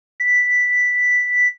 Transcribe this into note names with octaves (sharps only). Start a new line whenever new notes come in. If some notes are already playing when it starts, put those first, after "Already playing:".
B6